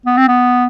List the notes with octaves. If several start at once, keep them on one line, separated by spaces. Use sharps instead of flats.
B3
C4
B3